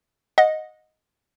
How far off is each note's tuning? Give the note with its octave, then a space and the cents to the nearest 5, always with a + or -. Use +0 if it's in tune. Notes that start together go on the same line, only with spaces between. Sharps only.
D#5 +0 F#5 -25